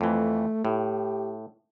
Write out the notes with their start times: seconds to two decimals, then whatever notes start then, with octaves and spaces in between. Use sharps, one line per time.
0.01 F2 E3 A3
0.65 A2 G4